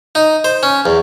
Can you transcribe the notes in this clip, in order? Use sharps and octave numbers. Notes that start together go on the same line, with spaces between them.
D#4
C5
C#4
E2